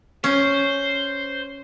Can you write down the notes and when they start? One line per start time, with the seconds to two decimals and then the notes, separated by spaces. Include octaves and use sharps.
0.24 C#4 C5